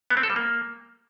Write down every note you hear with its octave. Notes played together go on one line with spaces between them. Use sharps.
B3
C4
A4
G3
A#3